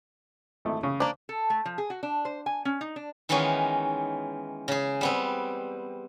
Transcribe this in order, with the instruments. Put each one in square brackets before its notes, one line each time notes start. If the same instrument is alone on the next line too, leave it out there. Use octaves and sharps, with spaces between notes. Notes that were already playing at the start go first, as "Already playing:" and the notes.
[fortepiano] G#1 A3 E4
C#3
[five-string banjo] A#3 D4 [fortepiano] C5 D6
[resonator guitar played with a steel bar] A4
A3
F3
G#4
F#4
D4
C5
G#5
C#4
D#4
D4
[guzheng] D#3 E3 G#3 B3 C#4 D#4
C#3 G#4
G3 B3 C4